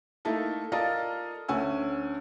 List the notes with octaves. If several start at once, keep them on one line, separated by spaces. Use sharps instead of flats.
A3 A#3 D#4 E4 A4
F4 A4 A#4 D5 D#5 F5
D2 C#4 F#5 G#5 E6